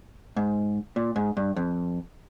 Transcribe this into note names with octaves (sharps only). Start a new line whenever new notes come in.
G#2
A#2
G#2
G2
F2